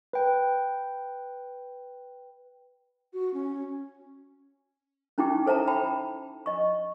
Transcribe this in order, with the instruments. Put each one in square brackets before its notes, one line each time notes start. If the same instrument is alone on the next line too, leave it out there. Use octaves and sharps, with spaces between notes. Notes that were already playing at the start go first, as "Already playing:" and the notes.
[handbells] B4 G5
[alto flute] F#4
C#4
[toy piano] C#4 D#4 E4 G4 G5 D6
A4 C5 E5 A5 A#5
G5 A5 B5
D#5 C#6